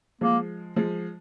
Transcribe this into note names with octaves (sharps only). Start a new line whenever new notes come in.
F3 G#3 A#3
F3 G#3